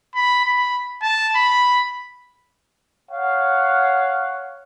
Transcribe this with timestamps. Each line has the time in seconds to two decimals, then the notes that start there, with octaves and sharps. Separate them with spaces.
0.15 B5
0.46 B5
1.02 A5
1.36 B5
3.10 C#5 F5 F#5